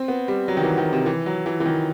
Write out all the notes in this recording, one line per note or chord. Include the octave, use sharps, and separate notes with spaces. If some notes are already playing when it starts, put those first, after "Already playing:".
Already playing: C4
B3
G3
F#3
D#3
E3
D#3
C3
E3
F#3
E3
E3
D#3